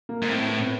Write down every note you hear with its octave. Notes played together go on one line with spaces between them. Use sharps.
A#3
G#2
A2 C4
B3
C4
B3